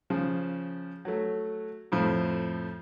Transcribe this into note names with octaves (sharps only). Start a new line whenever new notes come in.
C#3 F3
F#3 A3
F2 A2 F3